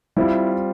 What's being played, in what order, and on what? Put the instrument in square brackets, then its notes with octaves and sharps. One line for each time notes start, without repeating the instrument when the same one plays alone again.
[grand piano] G3 C4 F4 [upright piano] E4